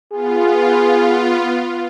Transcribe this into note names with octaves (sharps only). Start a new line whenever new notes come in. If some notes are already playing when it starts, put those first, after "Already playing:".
B3 F4 G#4